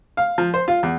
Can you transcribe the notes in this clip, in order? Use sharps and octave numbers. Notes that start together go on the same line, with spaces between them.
F5
F3
C5
F4
E2